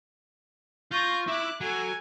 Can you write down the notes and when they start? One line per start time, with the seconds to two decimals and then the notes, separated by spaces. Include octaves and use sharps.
0.92 F4 C#6 G6 A#6
1.28 E4 E5 D6 F#6
1.61 F#3 A4 G#5